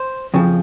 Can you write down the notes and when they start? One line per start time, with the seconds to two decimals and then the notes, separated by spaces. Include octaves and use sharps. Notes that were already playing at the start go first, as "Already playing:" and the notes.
Already playing: C5
0.34 F2 C#3 F3